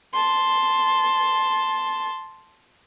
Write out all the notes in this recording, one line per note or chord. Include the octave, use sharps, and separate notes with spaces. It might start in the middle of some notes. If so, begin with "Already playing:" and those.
A5 C6